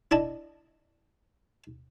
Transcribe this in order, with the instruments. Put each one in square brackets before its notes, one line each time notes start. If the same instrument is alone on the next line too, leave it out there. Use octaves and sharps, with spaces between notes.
[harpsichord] D4 E4 D#5 A5